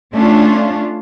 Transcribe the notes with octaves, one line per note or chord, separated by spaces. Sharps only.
A3 C#4 D4 F4